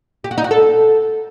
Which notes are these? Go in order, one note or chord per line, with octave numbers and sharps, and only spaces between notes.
G4
F#4
D#4
F#4
A4